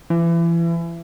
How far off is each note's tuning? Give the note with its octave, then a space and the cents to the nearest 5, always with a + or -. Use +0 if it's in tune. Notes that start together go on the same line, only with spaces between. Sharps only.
E3 +30